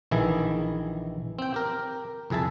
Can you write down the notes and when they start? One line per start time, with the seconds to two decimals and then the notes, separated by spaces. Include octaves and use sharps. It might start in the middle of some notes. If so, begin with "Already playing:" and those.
0.11 A#1 D#3 E3 E4 G#4
1.39 C4 G5
1.54 G4 A#4
2.30 C2 F2 G#4 E5 A5